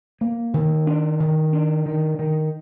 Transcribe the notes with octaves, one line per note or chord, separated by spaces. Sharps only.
A#3
D#3
D4
D#3
D4
D#3
D#3